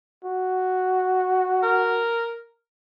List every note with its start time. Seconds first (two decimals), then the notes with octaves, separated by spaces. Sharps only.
0.24 F#4
1.63 A#4